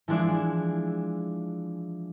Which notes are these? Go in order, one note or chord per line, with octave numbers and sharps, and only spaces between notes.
E3 F3 G#3 D4 E4